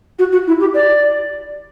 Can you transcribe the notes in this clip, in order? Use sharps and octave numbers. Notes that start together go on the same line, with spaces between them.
F#4
F#4
E4
G4
D5